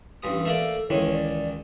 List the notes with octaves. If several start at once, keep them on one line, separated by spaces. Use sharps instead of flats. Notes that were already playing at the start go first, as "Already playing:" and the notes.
A1 G2 D#6
A3 A#3 A4 D5
C#2 D#3 E3 C#5
D5